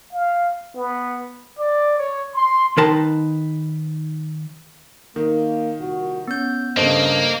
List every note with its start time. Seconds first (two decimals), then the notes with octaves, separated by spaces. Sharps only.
0.12 F5
0.76 B3
1.58 D5
1.97 C#5
2.33 C6
2.77 D#3 D#4 A#4 B4 A5 C6
5.16 D#3 A#3
5.78 C2 A#2 F#4
6.28 B3 C#4 G6
6.77 G2 C#3 G3 A#3 A4 C5 D#5